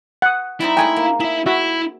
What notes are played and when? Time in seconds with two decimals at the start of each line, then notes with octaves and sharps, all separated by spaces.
0.22 F#5 D#6
0.60 G3 C4 D#4 E4
0.77 G#3 A3 G#4 G5 G#5
0.96 A#3
1.20 E4 G#4 E5
1.46 E4 F#4 E5